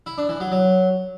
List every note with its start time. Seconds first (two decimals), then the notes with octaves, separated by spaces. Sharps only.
0.06 E4
0.18 D4
0.29 E3
0.40 F#3
0.52 F#3